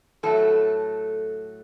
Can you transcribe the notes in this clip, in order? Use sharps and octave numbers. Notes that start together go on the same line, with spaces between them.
A2 F#3 A3 A4